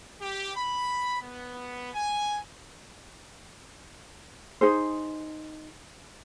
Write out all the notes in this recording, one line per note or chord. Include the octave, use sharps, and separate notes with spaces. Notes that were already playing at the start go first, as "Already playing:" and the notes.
G4
B5
B3
G#5
D#4 G#4 C5